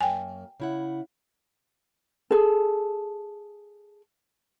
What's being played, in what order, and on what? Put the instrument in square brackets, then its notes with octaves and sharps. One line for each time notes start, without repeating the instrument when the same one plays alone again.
[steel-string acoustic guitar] F#2 A#3 [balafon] G5 G#5
[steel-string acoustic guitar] C#3 E4 F#5
[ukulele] G#4 A4